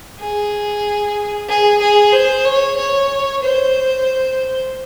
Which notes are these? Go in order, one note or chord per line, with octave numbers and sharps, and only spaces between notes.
G#4
G#4
G#4
C5
C#5
C#5
C5